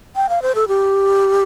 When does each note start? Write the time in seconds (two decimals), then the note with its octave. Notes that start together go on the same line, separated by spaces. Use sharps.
0.16 G5
0.29 F5
0.42 C5
0.55 A4
0.68 G4